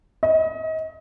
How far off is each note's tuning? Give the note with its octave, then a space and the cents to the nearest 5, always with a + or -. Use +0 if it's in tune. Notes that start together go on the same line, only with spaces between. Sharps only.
D#5 +35